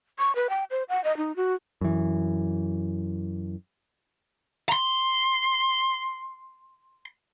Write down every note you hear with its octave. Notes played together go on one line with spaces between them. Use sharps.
C#6
B4
G5
C5
F#5
D#5
D#4
F#4
F#2 E3
A#5 C6